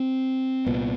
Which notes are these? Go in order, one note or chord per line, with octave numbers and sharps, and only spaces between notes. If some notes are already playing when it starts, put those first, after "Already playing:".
Already playing: C4
C2 A#2 B3